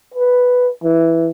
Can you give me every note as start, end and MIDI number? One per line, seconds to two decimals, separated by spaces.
0.14 0.70 71
0.84 1.30 52